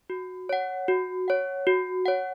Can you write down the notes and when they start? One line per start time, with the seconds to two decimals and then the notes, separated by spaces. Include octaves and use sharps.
0.10 F#4
0.49 C#5 F#5
0.88 F#4
1.28 C#5 F#5
1.67 F#4
2.06 C#5 F#5